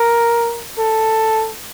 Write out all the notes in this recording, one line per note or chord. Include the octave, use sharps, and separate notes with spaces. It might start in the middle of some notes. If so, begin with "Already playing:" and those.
Already playing: A#4
A4